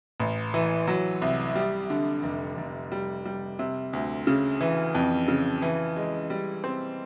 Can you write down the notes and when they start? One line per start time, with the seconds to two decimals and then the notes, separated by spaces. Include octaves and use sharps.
0.20 A1
0.54 E3
0.88 F#3
1.22 C2
1.55 G3
1.90 D3
2.23 F1
2.57 F1
2.92 G3
3.25 G3
3.59 C3
3.93 D2
4.27 C#3
4.61 E3
4.95 F2
5.28 C#3
5.62 E3
5.96 G#3
6.30 G3
6.64 C4